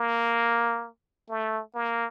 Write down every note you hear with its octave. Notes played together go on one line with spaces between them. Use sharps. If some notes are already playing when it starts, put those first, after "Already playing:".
Already playing: A#3
A3
A#3